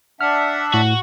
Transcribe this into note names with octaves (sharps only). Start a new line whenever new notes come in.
D4 E5 F#5 F6
A2 F#4